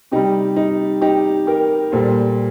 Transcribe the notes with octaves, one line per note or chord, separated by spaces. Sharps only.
C3 G3 D#4 G4
D#4
D#4 G4
G4 A#4
A#2 G3 A4 C5